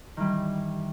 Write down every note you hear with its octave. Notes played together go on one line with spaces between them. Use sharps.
D#3 E3 G3